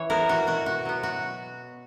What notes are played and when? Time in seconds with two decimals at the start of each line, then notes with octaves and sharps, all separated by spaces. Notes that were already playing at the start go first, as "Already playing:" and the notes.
Already playing: E3 C#5
0.10 B3 E4 A#4
0.29 F#4
0.47 B2 F#4
0.66 F#4
0.85 F#3 B3
1.03 F#4